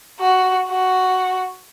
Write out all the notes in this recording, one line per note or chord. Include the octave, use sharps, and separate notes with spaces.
F#4
F#4